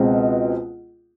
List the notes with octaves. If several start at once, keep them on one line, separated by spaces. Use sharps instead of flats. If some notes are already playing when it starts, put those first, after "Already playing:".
Already playing: C#2 B2 G#3 C4